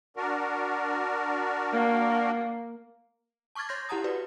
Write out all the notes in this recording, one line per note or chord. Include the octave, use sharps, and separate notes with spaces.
D4 F#4 A#4
A#3
A5 C#6 D6 F6 G#6 A6
C#5 C6 G6 A#6
E4 G4 F#5 A5 A#5 D#6
F#4 B4 D5